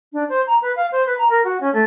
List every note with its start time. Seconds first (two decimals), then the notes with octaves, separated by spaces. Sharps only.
0.13 D4
0.29 C5
0.47 A#5
0.62 B4
0.76 F5
0.92 C5
1.06 B4
1.18 A#5
1.30 A#4
1.44 F#4
1.61 C#4
1.73 A3